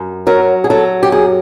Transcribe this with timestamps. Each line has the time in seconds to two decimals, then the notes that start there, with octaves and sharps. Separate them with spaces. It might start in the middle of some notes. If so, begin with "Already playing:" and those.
Already playing: F#2
0.27 F#3 A#4
0.64 G#4
0.70 F#3 A4
1.03 G4
1.12 F#2 G#4